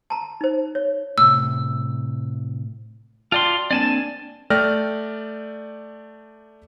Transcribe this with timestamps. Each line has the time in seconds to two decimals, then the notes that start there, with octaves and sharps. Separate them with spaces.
0.10 A5 A#5
0.41 D#4 C5
0.75 C#5
1.18 A2 C3 E6
3.32 F4 F#4 D5 G5 A5 C6
3.71 A#3 C4 D4 D5 G#5 A5
4.50 A3 D5 G5 F6 A#6